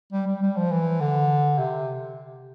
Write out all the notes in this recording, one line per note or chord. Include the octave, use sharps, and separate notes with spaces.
G3
G3
G3
F3
E3
D3
C3